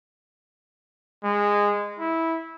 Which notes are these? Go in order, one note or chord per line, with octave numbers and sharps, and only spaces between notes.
G#3
E4